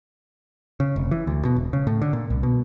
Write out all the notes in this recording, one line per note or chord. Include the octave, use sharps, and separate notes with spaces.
C#3
F1
E3
D2
B2
E1
C#3
A2
D3
A#2
C2
B2